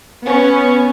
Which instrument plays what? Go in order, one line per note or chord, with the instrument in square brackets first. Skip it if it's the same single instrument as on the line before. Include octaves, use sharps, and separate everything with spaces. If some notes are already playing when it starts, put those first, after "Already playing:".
[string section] B3 C#4